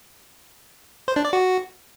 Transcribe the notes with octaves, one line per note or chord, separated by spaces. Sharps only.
C5
D4
D5
F#4